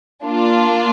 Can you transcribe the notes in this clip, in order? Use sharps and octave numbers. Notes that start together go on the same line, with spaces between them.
A#3 D4 F4